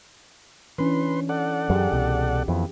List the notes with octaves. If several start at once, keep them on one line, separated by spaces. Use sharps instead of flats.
E3 C#4 D4 B4 C6
A4 D5 F#5
F#2 F#3 G4 G#4
C2 B2
F2 E3 B3